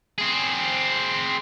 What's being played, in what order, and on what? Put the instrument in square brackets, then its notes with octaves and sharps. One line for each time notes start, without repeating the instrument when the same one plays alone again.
[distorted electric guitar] C4 G#4